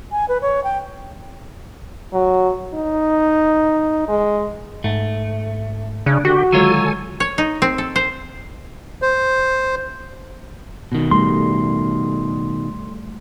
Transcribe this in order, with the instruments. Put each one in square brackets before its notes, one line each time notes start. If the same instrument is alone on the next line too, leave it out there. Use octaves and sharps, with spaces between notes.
[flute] G#5
B4
C#5
G5
[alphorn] F#3
D#4
G#3
[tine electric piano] G#2 [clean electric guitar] A3
[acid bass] C#3 [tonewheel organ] D4
[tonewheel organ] D3 G4 [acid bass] F#4
[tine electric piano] D3 D#3 G#3 [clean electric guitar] F#3 F4 C#5 [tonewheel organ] A4 G#5
[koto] C#5
D#4
C4
A4
C5
[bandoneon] C5
[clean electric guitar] B2 D#3
[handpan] G3 A3 [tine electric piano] C6